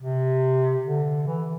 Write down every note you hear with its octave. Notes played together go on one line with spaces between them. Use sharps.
C3
D3
E3